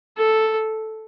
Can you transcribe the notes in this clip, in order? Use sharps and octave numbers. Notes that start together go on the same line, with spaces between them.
A4